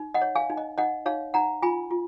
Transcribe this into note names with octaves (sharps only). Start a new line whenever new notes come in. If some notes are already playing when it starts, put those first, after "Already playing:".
Already playing: D#4
D#5 F#5
C#5
F5 G#5
D#4
D#5
D#4 D#5 F#5
D#4 C#5 F5
D#4 F#5 A#5
F4 G#5 B5
F4